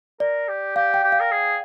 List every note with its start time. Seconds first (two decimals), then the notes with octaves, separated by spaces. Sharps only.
0.20 A#4 D5
0.48 G4
0.76 G4 F5
0.94 G5
1.04 G4
1.12 F5
1.20 A#4
1.31 G#4